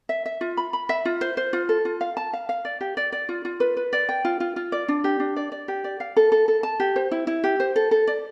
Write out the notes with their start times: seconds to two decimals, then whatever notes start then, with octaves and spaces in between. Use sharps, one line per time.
0.09 E5
0.26 E5
0.41 F4
0.57 B5
0.73 B5
0.89 E5
1.05 F4
1.21 C5
1.37 C5
1.53 F4
1.69 A4
1.85 F4
2.01 F5
2.17 A5
2.33 F5
2.49 F5
2.65 D5
2.81 G4
2.97 D5
3.12 D5
3.29 F4
3.45 F4
3.60 B4
3.77 B4
3.93 D5
4.09 G5
4.25 F4
4.40 F4
4.56 F4
4.72 D5
4.88 D4
5.04 G4
5.20 D4
5.36 D5
5.52 D5
5.68 G4
5.84 D5
6.00 F5
6.17 A4
6.32 A4
6.48 A4
6.63 A5
6.80 G4
6.96 C5
7.12 E4
7.27 E4
7.44 G4
7.60 C5
7.76 A4
7.91 A4
8.08 D5